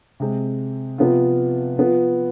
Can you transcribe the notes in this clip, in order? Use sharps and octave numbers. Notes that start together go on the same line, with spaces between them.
C3 G#3 C4
C3 F3 B3 F4
F3 B3 F4 B4